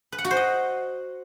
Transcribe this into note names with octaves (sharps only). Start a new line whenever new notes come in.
B4
F#5
F#4
C5
D#5